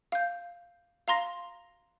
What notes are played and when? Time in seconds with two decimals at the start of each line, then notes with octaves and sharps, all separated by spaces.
0.12 F5 G6
1.08 F5 A#5 C6 A#6